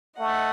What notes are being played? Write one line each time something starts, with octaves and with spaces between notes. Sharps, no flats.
A3 D#5 F#5